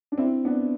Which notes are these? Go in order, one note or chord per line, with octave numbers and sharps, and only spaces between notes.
D4
C4 E4
B3 D4